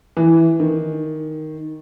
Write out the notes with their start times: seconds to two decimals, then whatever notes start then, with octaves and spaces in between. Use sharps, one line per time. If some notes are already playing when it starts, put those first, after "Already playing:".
0.17 E3
0.60 D#3